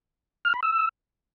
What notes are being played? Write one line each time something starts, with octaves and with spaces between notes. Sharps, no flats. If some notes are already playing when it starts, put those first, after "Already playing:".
F6
B5
E6